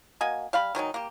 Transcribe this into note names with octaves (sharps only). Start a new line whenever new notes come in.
A#3 F#4 D#5 G#5
G3 F5 B5
D#3 F#3 G#3 D#4
A#3 G4